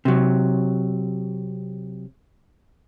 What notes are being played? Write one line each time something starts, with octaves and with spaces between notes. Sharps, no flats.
C3 F#3